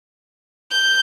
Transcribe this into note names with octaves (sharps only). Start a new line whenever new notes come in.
G6